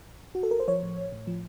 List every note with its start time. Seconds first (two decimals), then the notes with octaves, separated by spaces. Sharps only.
0.09 A1
0.23 A1
0.35 A1 F#4
0.43 A4
0.51 A1 A#4
0.60 C5
0.68 F3 C#5
0.83 A2
0.98 A1
1.12 A2
1.27 F3